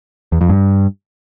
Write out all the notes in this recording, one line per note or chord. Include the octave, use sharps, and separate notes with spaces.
E2
F2
G2